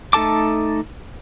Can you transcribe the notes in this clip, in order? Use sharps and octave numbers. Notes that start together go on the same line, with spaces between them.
A3 D#4 A4 A5 D6